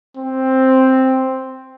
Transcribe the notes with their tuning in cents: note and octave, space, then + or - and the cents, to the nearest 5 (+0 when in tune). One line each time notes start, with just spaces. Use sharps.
C4 +5